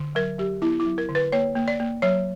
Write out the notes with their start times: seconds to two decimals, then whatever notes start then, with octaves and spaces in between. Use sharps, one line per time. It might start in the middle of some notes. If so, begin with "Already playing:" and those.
Already playing: D3
0.15 F#3 A#4
0.38 F#3 G4
0.62 B3 E4
0.80 E4
0.86 F#3
0.98 A#4
1.09 D3
1.15 B4
1.32 A#3 C#5
1.55 A#3
1.68 D5
1.80 A#3
2.02 F#3 C#5